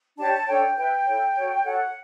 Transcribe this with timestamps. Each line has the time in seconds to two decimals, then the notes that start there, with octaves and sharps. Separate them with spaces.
0.17 D4 G4 C#5 A5
0.32 A5
0.47 D4 A4 C#5 G5
0.76 E4 B4 G5
1.05 E4 A4 C#5
1.35 F#4 A4 C#5
1.64 F#4 A4 C#5 F#5